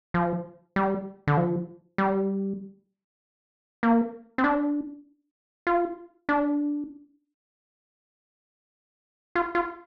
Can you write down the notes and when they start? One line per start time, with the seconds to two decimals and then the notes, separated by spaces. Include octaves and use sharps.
0.14 F3
0.76 G3
1.27 D3
1.37 F3
1.98 G3
3.83 A#3
4.38 C4
4.44 D4
5.67 F4
6.29 D4
9.35 F4
9.55 F4